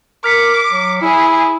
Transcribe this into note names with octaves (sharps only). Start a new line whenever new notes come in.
A#4 D6 F6 B6 C#7
F#3
E4 G#4